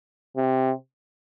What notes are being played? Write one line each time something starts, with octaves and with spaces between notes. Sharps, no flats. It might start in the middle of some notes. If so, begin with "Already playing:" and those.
C3